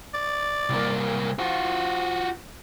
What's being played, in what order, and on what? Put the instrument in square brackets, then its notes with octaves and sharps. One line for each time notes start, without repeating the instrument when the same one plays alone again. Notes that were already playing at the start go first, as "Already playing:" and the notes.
[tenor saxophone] D5
[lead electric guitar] C2 A#3
[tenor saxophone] F3 [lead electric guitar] F4 F#4
[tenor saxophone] F3